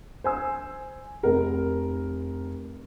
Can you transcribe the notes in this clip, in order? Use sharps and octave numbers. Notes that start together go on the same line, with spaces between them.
C5 G#5 E6
F1 A#4